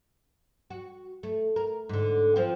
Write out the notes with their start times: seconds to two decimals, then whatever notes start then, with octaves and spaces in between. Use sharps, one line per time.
0.70 F#4
1.23 A3
1.56 A#4
1.89 G#2 D3
2.36 F3 C4 F4